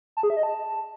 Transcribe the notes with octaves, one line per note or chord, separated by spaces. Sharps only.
A5
G#4
E5
D#5
A5